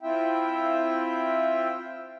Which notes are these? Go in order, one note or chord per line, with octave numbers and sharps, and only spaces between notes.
C4 E4 F4 E5 G5